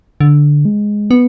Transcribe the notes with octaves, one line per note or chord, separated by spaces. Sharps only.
D3
G#3
B3